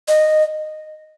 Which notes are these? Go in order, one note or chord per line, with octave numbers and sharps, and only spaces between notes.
D#5